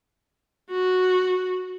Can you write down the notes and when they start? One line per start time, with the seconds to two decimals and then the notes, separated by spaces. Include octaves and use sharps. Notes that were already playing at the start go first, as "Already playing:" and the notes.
0.70 F#4